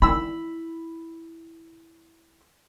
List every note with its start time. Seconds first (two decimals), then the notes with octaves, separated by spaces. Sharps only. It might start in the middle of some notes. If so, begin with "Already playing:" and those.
0.02 E4 B5 E6